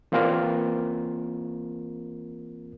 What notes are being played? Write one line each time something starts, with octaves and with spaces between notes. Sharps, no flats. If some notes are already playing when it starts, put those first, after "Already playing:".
E3 A#3 C4 F4 A#4